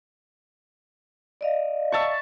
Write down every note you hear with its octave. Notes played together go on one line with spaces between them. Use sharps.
D5 D#5 F5
E5 A5 C#6